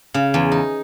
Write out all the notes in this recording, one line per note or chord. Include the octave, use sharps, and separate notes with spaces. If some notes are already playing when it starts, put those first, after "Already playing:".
C#3
E2
D#4